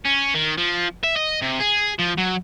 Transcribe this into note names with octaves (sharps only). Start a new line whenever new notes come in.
C#4
D#3
F3
E5
D#5
C3
G#4
F3
F#3